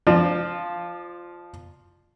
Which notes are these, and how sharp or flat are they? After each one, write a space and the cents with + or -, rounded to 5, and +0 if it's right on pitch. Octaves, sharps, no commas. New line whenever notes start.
F3 +0 F4 +0 D5 +40